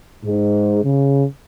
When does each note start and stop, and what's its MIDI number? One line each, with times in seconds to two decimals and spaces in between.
0.25 0.81 44
0.84 1.24 49